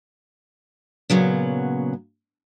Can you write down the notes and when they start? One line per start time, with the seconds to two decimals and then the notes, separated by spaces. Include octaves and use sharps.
1.10 A#2 C#3 F#3 B3